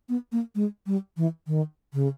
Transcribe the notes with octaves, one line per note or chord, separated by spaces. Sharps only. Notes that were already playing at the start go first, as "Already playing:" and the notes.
B3
A#3
G#3
G3
E3
D#3
C#3